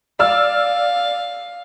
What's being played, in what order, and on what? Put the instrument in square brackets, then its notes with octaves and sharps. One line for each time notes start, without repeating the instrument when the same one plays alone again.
[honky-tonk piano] D5 E6 F6 [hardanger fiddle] F5